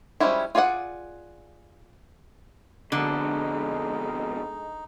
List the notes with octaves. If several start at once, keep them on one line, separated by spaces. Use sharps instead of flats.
F3 G3 G#3 C#4 E4
F4 G#4 D5 F5 F#5
F2 B2 D3 G#3 D#4